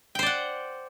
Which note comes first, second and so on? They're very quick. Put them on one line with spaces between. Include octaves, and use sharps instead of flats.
G5 C5 D5 F#5